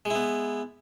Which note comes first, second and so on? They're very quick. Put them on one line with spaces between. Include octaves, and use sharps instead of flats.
G#3 E4 B3